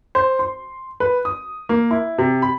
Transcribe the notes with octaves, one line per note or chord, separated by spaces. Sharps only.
C5
C6
B4
D#6
A#3
E4
C3
B5